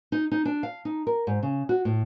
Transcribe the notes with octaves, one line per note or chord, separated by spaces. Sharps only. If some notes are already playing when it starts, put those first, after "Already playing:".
D#4
D#4
D4
F5
D#4
A#4
G#2
C#3
F#4
A2